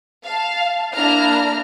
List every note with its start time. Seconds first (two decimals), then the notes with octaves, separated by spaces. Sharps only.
0.24 F5 A5
0.94 A#3 D4 E4 A#5 F6